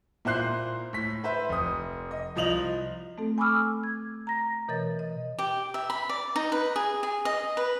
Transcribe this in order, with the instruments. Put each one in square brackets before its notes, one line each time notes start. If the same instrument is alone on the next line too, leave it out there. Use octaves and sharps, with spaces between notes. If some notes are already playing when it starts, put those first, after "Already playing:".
[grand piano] A#2 E4 C5 F#6 C7
A2 B6
B4 C5 E5
F1 D#6
D#5
C2 F3 D#5 F7 F#7
[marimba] A3 C4 A4
G#5 B5 C#6 D6 E6 F6
G#6
A#5 A#6
B2 E3 A#4 C#5 D#5 A6
D#5
[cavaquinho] G4
E5
B5
D5
D#4
B4
G#4
G#4
D#5
B4